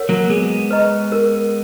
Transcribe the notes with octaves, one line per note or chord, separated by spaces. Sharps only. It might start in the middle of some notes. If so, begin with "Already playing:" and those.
Already playing: A#4 C#5 F#5
F#3 A#3
G#3 B3 G#4
B4 D#5 A#5 C#6
A#4